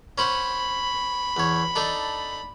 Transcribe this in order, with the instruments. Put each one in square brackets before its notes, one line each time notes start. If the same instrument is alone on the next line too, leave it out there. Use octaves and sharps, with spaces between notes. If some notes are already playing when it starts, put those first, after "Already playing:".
[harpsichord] C#4 C5 F#5 [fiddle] B5
[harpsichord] E2 C#5
D4 D#4 A4